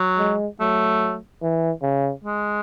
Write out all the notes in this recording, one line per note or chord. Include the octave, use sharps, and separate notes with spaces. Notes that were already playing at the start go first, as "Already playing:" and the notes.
Already playing: F#3
G#3
F#3 A3
E3
C#3
G#3